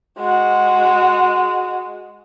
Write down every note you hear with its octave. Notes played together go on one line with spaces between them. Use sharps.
G#3 F#4